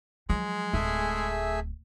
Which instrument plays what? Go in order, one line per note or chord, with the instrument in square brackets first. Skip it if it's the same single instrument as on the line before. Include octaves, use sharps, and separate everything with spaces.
[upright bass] F3 F#3 [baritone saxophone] G#3
[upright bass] D1 [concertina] A3 G#4 E5